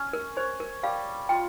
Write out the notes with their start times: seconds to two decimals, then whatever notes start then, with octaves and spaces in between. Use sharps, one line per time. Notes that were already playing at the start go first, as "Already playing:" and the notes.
Already playing: C#4
0.13 A#4
0.37 C5 C#5
0.60 A#4
0.83 G3 F5
1.29 F4 G5